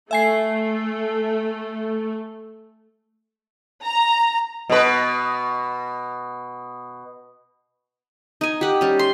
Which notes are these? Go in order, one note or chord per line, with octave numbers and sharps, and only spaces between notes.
A3 E5 G#5 C7
A#5
B2 B4
D#4 G#5
G4 F#5
G3 C#4
C6